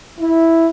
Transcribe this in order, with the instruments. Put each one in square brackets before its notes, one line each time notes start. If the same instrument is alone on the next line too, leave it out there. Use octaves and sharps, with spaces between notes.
[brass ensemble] E4